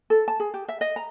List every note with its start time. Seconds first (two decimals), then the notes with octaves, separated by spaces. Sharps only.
0.10 A4
0.28 A5
0.40 G#4
0.54 G4
0.68 E5
0.81 D#5
0.96 A#5